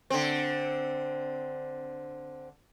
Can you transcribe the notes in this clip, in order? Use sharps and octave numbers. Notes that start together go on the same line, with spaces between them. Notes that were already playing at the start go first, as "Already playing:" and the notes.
D3 C4